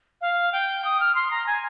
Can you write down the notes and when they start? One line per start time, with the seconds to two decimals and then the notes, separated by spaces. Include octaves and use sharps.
0.21 F5
0.53 G5
0.85 D#6
1.00 F6
1.15 C6
1.31 A#5
1.47 G#5